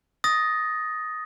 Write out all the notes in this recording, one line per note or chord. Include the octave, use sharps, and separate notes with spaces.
D#6 A6 A#6